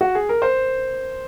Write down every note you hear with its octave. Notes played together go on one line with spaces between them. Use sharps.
F#4
G#4
A#4
C5